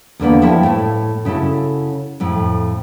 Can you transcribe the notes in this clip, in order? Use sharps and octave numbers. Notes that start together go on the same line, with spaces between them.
E2 D3 A#3 B3
F3 E4 E5 G5 A5
A2 A3
C#3 E4 F#4 A4
F2 A2